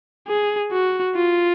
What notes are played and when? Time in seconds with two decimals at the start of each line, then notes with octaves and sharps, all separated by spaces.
0.28 G#4
0.72 F#4
1.16 F4